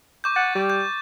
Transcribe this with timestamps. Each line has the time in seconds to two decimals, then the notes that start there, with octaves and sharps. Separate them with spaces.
0.24 C#6 D6 G6
0.36 F#5 A6
0.55 G3
0.70 G6